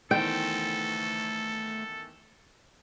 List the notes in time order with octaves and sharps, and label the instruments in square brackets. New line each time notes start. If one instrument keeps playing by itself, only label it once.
[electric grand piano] D#3 E3 B3 [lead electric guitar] A3 C5 [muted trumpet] A4 [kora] G5